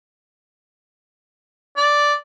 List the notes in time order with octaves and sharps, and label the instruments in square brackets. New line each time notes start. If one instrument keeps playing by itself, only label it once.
[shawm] D5